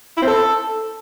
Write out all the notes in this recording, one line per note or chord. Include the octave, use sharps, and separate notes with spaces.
E4
C4
A4